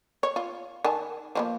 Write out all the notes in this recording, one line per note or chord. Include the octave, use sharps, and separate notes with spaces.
C#5
F4
D#3 G#5 A5
F3 G3 A#3